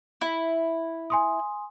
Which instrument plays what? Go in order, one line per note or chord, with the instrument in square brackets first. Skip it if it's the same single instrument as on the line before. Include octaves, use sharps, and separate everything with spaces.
[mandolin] E4
[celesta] G#5 C6 D#6